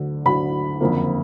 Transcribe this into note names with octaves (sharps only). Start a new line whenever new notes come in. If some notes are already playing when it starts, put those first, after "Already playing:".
Already playing: D2 D3 F#3
D2 D3 F#3 B5
F#1 F2 D3 F3 A#3